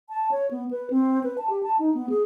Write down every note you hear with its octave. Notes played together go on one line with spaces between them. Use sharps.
A5
C#5
B3
B4
C4
B4
A5
G4
A5
D#4
B3
G#4